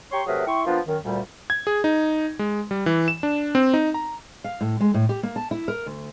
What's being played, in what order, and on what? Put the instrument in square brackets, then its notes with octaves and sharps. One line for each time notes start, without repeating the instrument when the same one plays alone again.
[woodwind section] G4 C#5 A#5 C6 C#6
C3 F#3 A3 G#4 A#4 B4
E4 G5 C6 C#6
F3 A#3 B3 D4 F4
F#2 D#3
D2 A#2 G3
[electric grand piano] G#6
G#4
D#4
G#3
G3
E3
E7
D4
C4
D#4
A#5
[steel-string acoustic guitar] F5
A2
G#3
A2
G4
A#3
A5
E4
A#4
D2